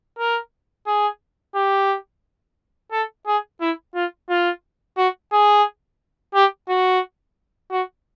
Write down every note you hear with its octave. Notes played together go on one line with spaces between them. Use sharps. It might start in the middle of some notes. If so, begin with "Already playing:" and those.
A#4
G#4
G4
A4
G#4
E4
F4
F4
F#4
G#4
G4
F#4
F#4